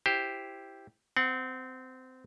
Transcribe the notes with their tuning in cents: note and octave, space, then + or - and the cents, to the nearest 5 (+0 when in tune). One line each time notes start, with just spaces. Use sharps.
E4 +0 G4 +0 C5 +0
C4 -20 F#5 +5